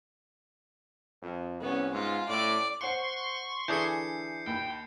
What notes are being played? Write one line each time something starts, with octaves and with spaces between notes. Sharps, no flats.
F2
C2 B3 C#4
G#2 F4
A2 D5
C5 F#5 C6 C#6 C7
D3 E3 D4 G#4 G6 C7 C#7
D#2 G5 B5